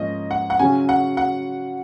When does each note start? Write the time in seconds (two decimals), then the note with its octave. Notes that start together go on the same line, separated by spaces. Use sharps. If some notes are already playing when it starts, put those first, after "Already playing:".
Already playing: G#2 F3 A#3 C#4 D#5
0.31 F#5
0.50 F#5
0.59 C#3 F#3 C#4 G#5
0.89 F#5
1.17 F#5